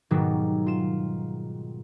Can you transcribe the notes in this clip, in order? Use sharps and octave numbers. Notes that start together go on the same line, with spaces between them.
G#2 B2 D#3 F#3 G3
F4 E7